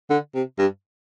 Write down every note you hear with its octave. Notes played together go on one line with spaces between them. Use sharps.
D3
C3
G2